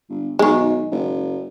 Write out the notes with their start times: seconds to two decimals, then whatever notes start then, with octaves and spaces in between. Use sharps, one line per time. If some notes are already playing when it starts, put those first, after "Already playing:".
0.10 G1
0.39 B1 D#3 G#3
0.91 F#1